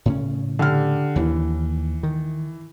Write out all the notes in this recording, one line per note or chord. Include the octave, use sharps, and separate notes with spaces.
A2 C#3 C#4
D3 G4 F6
D#2 E3
D#3